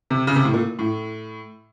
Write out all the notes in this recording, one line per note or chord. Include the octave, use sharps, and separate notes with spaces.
C3
C#3
C3
A2
A#2
A2